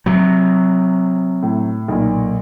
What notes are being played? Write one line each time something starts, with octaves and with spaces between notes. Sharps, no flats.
C3 F#3
A2
B1 A#2